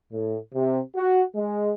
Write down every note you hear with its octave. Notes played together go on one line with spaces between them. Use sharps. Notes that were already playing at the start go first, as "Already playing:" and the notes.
A2
C3
F#4
G#3